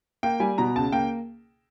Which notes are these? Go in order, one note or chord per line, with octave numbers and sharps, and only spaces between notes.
A#3 G5
G3 G#5
B2 A#5
C#2 A5
A#3 G5